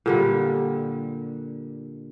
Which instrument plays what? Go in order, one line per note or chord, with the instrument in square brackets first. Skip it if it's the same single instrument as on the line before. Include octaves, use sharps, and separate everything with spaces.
[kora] A#2 D3 G3